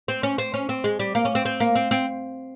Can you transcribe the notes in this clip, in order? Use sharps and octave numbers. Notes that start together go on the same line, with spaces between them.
C4
C#4
C4
C#4
C4
G#3
G3
A#3
C#4
C4
C4
A#3
C4
C4